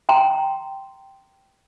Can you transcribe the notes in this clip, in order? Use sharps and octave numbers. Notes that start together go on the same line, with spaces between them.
G5 A#5 C6